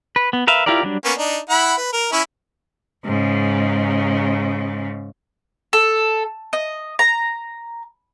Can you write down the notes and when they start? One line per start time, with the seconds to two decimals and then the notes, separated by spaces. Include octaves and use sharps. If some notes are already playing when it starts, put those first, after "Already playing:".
0.16 B4
0.33 B3
0.47 A#4 B4 E5 F5
0.66 E4 F4 G4 A#4 D5
0.83 F#3 G3 D4
1.05 A#3 B3 C#4
1.18 D4 D#4
1.50 E4 F#5 B5
1.78 B4
1.93 A#4
2.12 C#4 E4 B5
3.05 G#2 C#3
5.73 A4
6.53 D#5
6.99 A#5